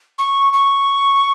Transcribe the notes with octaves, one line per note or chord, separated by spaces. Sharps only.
C#6
C#6